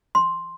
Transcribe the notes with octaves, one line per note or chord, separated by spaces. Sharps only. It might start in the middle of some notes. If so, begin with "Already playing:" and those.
C6